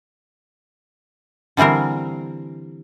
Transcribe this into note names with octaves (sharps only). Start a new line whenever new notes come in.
D3 E3 G3 C4 A#4